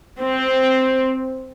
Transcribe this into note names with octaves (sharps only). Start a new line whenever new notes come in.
C4